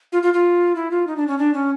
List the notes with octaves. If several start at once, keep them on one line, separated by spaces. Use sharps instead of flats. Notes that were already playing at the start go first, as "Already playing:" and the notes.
F4
F4
F4
E4
F4
D#4
D4
C#4
D4
C#4